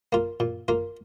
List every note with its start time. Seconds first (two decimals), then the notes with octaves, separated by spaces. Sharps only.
0.12 A#3 F4
0.40 A#2
0.68 A#3 F4